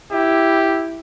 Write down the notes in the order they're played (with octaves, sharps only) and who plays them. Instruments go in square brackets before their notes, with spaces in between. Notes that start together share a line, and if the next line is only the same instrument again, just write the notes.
[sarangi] E4 [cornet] G4